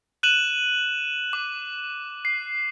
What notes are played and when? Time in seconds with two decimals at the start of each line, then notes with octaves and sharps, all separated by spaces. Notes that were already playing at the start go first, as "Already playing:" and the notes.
0.23 F#6 D#7 E7 F#7
1.33 D6
2.25 C7